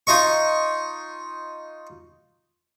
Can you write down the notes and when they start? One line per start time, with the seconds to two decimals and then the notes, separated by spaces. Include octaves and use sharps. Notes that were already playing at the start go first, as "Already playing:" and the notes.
0.07 D#4 F4 D#5 C#6